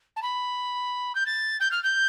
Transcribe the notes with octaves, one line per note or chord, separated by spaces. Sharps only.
A5
B5
G6
A6
G6
F6
G6